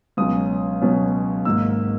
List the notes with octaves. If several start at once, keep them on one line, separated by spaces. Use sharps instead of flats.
C#2 B2 F#3 C#4 D#6
C#2 B2 F#3 C#4
G#1 G#2 D#3 A#3 E6